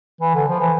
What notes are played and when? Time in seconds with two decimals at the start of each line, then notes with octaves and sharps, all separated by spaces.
0.21 E3
0.35 D3
0.48 F3
0.60 E3